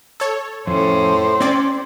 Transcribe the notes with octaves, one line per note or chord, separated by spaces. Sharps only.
A4 C#5
F2 A2 C#4 C5
C4 C#4 D5